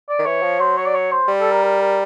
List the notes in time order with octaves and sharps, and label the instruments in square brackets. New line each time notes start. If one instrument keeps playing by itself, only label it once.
[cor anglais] D5
[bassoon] D#3
[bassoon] E3 [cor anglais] C#5
[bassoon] F3
[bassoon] F#3 [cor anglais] C5
[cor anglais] C#5
D5
C#5
C5
[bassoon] G3
[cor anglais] A4
A#4
A#4
A#4